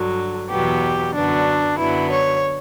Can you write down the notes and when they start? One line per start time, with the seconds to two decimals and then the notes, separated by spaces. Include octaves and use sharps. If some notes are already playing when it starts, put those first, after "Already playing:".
Already playing: G2 D3 F#3
0.50 E2 B2 F#3 B3 G4
1.14 F#2 D3 F#3 B3 D4
1.79 F#2 D3 F#3 B3 E4
2.11 C#5